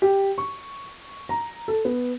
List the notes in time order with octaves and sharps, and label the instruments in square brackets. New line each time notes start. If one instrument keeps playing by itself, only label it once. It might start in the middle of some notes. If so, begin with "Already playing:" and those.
[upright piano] G4
C#6
A#5
A4
B3